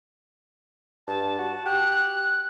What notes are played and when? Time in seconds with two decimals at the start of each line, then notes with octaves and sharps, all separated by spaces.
1.07 G2 A5
1.39 F#4
1.66 G4 F#6